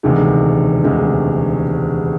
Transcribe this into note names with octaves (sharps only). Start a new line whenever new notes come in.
E1 D2 C3 D#3 G#3
E1 D2 C3 D#3 G#3